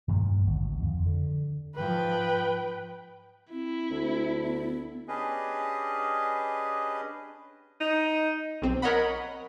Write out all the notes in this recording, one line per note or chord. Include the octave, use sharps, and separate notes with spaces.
G2 A#2 D#3 F3
G#1 D2
F2
D3
G#2 F3 B4 G5
C4 E4
D2
B3
C#4 D4 G4 G#4 B4 D#5
D#4
B1 C4
A#4 C#5 D#5 F#5 B5